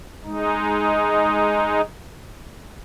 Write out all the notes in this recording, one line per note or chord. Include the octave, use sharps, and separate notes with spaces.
G#3 D#4